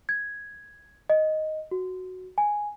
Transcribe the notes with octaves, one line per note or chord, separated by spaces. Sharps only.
G#6
D#5
F#4
G#5